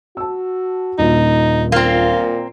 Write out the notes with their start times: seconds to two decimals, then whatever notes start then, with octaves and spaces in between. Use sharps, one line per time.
0.17 F#4 A5 E6
0.98 D#1 A#1 D#4
1.72 A#2 A#3 C4 F4